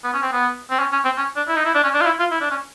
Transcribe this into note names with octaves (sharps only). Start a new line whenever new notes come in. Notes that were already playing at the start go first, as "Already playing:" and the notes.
B3
C#4
C4
B3
C4
C#4
C#4
C4
C#4
D4
E4
D#4
E4
D4
C#4
D4
F4
E4
F4
E4
D4
C#4